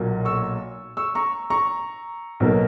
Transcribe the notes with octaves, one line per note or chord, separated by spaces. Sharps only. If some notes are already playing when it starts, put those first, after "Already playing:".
Already playing: B1 A#2 F#3 A#3
C#6 E6
C#6 E6
A#5 C#6
A#5 C#6
B1 B2 F#3 A#3